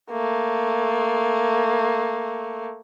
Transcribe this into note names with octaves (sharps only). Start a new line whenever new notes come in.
A3 A#3